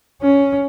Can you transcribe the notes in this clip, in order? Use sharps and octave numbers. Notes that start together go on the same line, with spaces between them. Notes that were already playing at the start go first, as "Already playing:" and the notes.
C#4